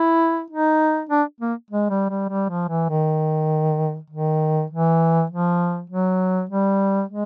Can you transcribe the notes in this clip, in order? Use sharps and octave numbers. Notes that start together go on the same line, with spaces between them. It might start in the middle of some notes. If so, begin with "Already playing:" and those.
Already playing: E4
D#4
D4
A#3
G#3
G3
G3
G3
F3
E3
D#3
D#3
E3
F3
F#3
G3
G#3